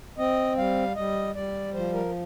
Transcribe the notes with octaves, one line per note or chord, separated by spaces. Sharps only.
C4 D#5
G3 F5
G3 D#5
G3 D5
F3 C5
A#4